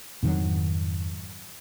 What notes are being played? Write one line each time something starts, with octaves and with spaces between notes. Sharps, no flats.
F2 G#2 D#3 F#3